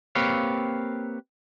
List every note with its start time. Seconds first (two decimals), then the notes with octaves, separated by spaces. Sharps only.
0.15 A#3 C4 G4 B4 C#5 F5